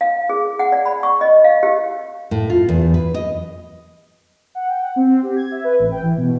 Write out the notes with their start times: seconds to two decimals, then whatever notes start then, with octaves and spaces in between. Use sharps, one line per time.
0.01 F5
0.29 G#4
0.59 F#5
0.72 D5
0.86 B5
1.03 C#6
1.21 D#5
1.44 F5
1.63 G4
2.31 A2
2.50 F4
2.69 E2
2.94 B4
3.14 D#5
4.55 F#5
4.69 G5
4.82 F#5
4.96 C4
5.22 G4
5.36 G#6
5.51 E5
5.64 B4
5.79 A1
5.92 G5
6.03 E3
6.17 B2